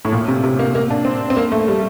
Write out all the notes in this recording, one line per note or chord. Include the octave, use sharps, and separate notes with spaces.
A2
A#2
C3
C3
A#3
A#3
D4
C4
C4
A#3
A3
G3